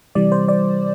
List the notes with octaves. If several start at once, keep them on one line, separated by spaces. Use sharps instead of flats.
C3 E3 G3 D5
C5
D5